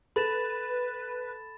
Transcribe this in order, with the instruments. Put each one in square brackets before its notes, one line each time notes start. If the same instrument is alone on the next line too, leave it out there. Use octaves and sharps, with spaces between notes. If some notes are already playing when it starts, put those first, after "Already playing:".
[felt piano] A4 [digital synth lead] B4 [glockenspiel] B5 A6 E7